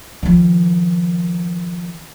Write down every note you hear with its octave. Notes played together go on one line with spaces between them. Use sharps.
D#3 F3